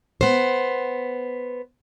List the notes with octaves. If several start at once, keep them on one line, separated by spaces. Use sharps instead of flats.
B3 C5